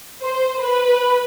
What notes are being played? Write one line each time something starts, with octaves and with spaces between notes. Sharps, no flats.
C5
B4